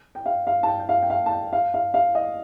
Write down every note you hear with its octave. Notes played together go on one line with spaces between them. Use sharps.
G5
F5
F5
A5
G5
G5
F5
G5
F5
A5
G5
F5
F5
F5
D#5